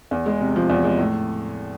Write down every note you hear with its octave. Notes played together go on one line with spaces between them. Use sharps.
E2
G#3
C3
F3
E2
G#3
A2